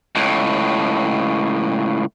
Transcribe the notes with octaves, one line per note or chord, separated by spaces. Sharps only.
C#2 A2